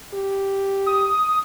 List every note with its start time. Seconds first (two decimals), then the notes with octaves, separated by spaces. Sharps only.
0.14 G4
0.86 D#6